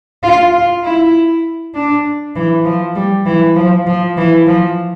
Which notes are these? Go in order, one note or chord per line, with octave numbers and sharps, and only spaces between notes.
F4
F4
E4
D4
E3
F3
G3
E3
F3
F3
E3
F3